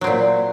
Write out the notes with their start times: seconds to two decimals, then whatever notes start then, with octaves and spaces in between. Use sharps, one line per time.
0.01 F#3
0.04 C4
0.07 A#2